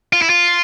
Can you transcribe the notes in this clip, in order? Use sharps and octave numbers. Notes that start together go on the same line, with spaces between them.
F4
E4
F4